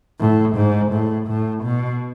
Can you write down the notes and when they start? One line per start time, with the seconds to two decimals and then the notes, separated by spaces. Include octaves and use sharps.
0.19 A2
0.56 G#2
0.92 A2
1.28 A2
1.64 B2